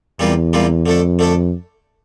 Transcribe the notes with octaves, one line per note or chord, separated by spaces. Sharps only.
E2 C3 E3 G3 A#3 F4
C3 E3 G3 A#3 F4
F2 D3 A3 D4 A4
D3 A3 D4 A4